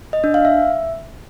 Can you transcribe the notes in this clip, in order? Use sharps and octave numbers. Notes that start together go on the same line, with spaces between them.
D#5
D4
F5
E5